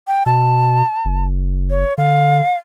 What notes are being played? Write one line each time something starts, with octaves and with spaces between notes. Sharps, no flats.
G5
B2 A5
F#1
C#5
D3 F5